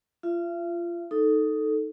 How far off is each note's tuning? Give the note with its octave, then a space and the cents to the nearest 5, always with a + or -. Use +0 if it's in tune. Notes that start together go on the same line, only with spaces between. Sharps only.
F4 -20 E5 +45
D#4 +5 A4 +0